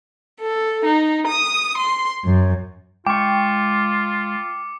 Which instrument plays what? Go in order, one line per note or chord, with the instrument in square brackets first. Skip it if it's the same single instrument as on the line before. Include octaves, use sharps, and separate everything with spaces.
[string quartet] A4
D#4
D#6
C6
F#2
[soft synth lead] G#3 [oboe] F4 [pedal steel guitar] G5 C#6 [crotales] D6 C#7